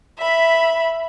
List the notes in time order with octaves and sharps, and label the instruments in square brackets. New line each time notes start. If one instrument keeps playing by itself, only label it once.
[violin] E5 B5